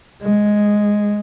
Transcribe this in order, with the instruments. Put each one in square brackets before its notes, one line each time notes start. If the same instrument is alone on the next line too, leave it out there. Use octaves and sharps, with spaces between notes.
[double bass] G#3